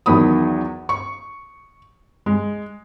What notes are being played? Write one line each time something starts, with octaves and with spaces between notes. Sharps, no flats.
E2 D#3 F#3 B5 D#6
C#6
G#3